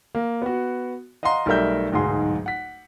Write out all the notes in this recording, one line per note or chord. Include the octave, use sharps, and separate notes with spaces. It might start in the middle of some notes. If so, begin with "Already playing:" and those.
A#3
B3 F#4
D#5 F5 F#5 A#5 C6
B1 G3 A3 A#4 E5 G6
D1 B1 G#2 G#4 C6
F#5 B6